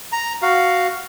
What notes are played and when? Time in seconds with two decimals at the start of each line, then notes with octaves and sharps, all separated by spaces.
0.12 A#5
0.42 F#4 F5